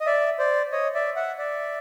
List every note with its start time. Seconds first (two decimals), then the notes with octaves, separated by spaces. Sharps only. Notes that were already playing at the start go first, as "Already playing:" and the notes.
0.01 D#5
0.06 D5 E5
0.39 C5 D5
0.72 C#5 D#5
0.94 D5 E5
1.16 E5 F#5
1.38 D5 E5